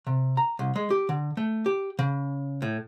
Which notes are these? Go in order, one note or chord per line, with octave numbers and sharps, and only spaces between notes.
C3
A#5
C2
G#3
G4
D3
A3
G4
C#3
A2